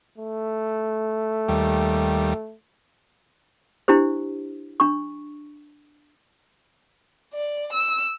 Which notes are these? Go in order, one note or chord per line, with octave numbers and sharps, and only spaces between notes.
A3
D#2 G3
D4 E4 G4 C5
D4 C#6
D5
E6